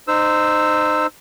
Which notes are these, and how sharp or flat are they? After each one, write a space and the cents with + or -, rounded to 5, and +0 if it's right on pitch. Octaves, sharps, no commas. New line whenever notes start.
D#4 -25 C5 -15 E6 +0